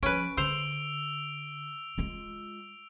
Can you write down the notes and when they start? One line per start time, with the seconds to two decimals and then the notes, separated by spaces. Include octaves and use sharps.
0.03 F3 C#4 B4 D7
0.37 D3 C5 E6 F7 G7
1.98 G#3 F4